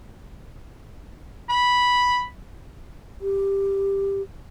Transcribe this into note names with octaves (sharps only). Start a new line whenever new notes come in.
B5
G4